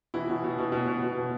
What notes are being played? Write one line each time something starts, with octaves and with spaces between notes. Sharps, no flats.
B2 E3 E4
B2
B2
B2
B2
B2
B2
B2